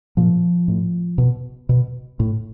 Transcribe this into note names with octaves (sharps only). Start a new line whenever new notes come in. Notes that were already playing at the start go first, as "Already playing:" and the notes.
A#2 F3
A2
B2
B2
A2